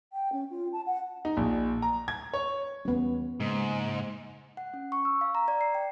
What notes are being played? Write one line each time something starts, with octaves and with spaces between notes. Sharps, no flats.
G5
C#4
F4
A5
F#5
D#4
A#1
A#5
G#6
C#5
E2 G3 B3 C#4
G#2 C#3 G#3 A#3
F#5
C#4
C#6
E6
F5
A#5
D5
C7
G5